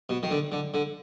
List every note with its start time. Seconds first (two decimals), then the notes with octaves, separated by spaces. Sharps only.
0.09 B2
0.23 D#3
0.31 D3
0.52 D3
0.74 D3